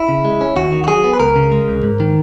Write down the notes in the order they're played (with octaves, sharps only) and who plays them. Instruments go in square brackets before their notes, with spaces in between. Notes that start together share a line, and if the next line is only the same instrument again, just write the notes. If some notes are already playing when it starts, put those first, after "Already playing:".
Already playing: [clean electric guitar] E4
C#3
G#3
C#4
D#2 F#4
D#3
F#4
F#3 G#4
B3
B4
C#2 A#4
C#3
G#3
C#2
G#2
D#3